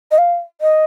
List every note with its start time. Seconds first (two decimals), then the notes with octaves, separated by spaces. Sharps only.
0.11 D#5
0.18 F5
0.61 D#5